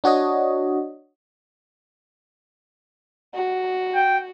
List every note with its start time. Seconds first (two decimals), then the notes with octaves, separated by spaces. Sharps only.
0.04 D4 F#4 C#5 D#5
3.35 F#4
3.95 G5